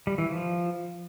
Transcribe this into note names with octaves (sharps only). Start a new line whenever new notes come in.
G3
E3
F3